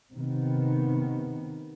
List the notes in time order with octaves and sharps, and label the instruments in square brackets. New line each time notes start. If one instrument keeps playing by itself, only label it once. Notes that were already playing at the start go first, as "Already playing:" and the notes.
[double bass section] C3 D#3 B3